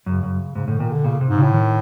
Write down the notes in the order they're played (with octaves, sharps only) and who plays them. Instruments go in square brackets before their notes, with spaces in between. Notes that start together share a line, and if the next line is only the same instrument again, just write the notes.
[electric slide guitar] F#2 [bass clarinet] C#3
[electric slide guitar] F#2
[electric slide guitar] G#2 [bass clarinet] C#3
[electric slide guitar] A2 [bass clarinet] D3
[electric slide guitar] A#2 [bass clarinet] D#3
[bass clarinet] D3
[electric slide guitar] A#2 [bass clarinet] C#3
[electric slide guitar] C3
[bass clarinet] G#2
[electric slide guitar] C#3
[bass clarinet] A2
[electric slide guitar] D#3